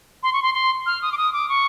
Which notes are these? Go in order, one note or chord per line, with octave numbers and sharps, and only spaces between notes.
C6
C#6
C6
C6
F6
D#6
D6
D#6
D6
C#6